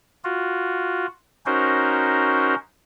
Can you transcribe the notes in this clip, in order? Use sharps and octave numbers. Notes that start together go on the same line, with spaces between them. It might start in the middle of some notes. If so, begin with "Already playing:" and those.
F4 F#4
C#4 D#4 F#4 A#4 C5